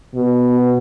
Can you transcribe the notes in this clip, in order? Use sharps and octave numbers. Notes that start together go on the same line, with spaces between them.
B2